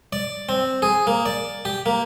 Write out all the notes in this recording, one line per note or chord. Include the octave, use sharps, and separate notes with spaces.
D5
C4
G#4
A#3
D5
G4
A#3